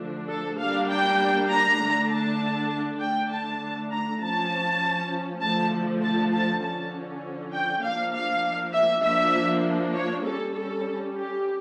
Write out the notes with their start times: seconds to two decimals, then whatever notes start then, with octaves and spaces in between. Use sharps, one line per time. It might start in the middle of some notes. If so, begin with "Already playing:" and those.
Already playing: D3 F3 A3 D4
0.29 A4
0.59 G3 A#3 D4 F5
0.90 G5
1.50 A#5
1.80 D3 A3 D4
2.10 A5
3.00 D3 A3 D4 G5
3.31 A5
3.91 A#5
4.21 F3 C#4 A5
5.41 D3 F3 A3 A5
6.02 A5
6.33 A5
6.62 D3 F3 C#4 A5
7.53 G5
7.82 F3 A#3 D4 F5
8.13 F5
8.73 E5
9.03 F3 A#3 D4 E5
9.94 C#5
10.24 G3 C#4 A4
10.54 A4
11.14 G4